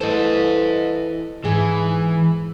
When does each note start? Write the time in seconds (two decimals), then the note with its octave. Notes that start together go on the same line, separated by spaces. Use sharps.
0.01 E3 A3 A4 C5 D#5 A5
1.45 G#2 E3 G#4